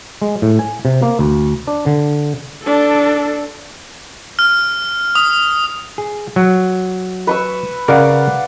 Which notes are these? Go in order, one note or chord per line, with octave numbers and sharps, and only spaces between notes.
G#3
A2
G#5
C3
A#3
D2
D4
D3
D4 A4
F6
D#6
G#4
F#3
B4 C#6 E6
C#3 A#4 D5 F5 F#5